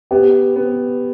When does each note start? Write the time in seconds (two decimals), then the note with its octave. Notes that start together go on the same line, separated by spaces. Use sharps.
0.11 B3 G4
0.56 B3